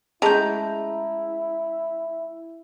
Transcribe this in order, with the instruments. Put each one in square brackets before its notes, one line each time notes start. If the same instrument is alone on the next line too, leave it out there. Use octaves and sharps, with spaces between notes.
[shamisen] G#3 A3 [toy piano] C#4 G#4 A5 [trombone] E4 [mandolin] A#5 G6